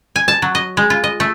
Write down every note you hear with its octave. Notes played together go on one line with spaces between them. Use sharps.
G#5
A5
F#3
D#5
G#3
F4
D#5
A3